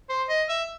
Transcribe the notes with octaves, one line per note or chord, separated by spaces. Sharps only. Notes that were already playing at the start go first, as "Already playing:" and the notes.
C5
D#5
E5